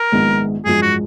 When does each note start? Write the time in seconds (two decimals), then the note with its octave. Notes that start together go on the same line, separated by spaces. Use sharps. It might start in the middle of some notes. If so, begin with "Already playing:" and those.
Already playing: A#4
0.12 A#1 G#2 D#3 G#3 B3
0.65 G#1 F#2 F3 G#3 G#4
0.82 F#4